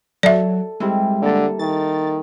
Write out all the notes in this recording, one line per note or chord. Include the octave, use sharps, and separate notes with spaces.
F#3 A4 D5 E5
G3 G#3 C4 E4
D3 A#3 A4
D#3 A6